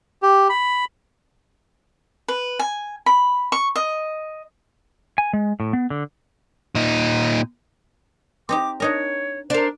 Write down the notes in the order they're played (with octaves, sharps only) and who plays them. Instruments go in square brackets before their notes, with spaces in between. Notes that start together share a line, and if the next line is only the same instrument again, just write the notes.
[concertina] G4
B5
[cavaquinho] B4
G#5
B5
C#6
D#5
[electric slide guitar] G#5
G#3
A2
B3
D3
[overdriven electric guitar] A#2 D#4
[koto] C4 D#4 G4 [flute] D6
[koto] D4 D#4 A#4 [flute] C#5
[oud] D4 A#4 [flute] C5